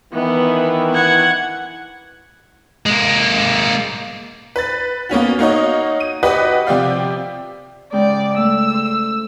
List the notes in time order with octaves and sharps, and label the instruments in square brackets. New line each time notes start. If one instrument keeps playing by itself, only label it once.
[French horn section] D#3 E3 E4 [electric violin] B3
[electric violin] F#5 G#6
[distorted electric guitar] G#3 A#3
[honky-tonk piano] B4 A6
A#3 B3 C#4 F#4
A#3 D#4 F#4 C#5 D#5
D#7
F#4 G4 B4 D5 D#5 F#5
C3 F3 G4 D5 F5
[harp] G#2 C#3 G5 [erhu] D5
[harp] A3 [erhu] E6
[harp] C5